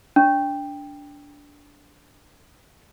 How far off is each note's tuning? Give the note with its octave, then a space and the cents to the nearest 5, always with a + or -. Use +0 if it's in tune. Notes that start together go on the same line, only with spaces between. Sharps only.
D4 -15